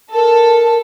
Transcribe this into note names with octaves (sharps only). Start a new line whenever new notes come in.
A4 A#4